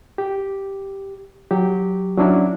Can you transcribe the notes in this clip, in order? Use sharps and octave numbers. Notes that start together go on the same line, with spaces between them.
G4
F#3 G4
F#3 C#4 D4 E4